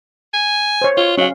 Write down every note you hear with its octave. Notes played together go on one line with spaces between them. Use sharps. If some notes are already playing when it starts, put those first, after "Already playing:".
G#5
C5 C#5
F4 C#5
F#3 C#4 F5